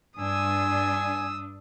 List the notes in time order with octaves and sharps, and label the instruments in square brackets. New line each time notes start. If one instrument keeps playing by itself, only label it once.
[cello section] G2 D4 [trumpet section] G#5 [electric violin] D#6 E6